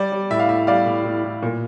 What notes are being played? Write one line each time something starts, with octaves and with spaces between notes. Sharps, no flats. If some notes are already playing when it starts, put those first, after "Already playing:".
Already playing: G3 D5
G3
A2 E5
F5
A2 E5
G3 D5 F5
A2
A2
A2
A#2